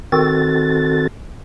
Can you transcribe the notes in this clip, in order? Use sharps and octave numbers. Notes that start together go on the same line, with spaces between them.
D#3 C4 F#4 A4 A6